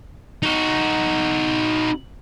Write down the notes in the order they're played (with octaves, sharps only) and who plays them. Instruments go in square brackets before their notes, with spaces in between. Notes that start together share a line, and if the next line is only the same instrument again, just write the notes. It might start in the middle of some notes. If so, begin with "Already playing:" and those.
[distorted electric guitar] D#4 F#4